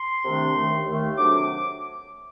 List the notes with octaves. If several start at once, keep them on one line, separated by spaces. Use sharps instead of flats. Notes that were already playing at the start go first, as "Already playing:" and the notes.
Already playing: C6
C2 C3 D#3 A3 D4
D#2 D#3 A3
D#2 D#3 A3
C3 F#3 A3 D4 D6
D6